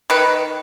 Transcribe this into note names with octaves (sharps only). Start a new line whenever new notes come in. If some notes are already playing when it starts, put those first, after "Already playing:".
D#3 B4